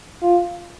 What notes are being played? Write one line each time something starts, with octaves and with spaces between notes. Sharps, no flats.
F4